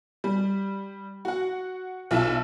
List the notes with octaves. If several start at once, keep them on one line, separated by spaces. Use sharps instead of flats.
G3
F#4 F#5
B1 F4 E5 A5